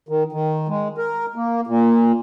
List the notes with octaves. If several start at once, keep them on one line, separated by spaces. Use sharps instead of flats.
D#3
D#3
G#3
A#4
A#3
A#2